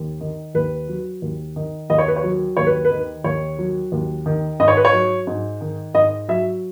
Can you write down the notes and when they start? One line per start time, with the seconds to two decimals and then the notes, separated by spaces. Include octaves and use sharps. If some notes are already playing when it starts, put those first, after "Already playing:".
Already playing: D#2
0.21 D#3
0.55 D#2 B4
0.88 F#3
1.22 D#2
1.56 D#3
1.90 D#2 D#5
1.98 C#5
2.08 B4
2.16 C#5
2.23 F#3
2.57 D#2 C#5
2.67 B4
2.85 B4
2.91 D#3
3.24 D#2 C#5
3.59 F#3
3.92 D#2
4.26 D#3
4.60 G#2 D#5
4.68 C#5
4.77 B4
4.85 C#5
4.93 F#3
5.27 G#2
5.61 D#3
5.94 G#2 D#5
6.28 F#3 E5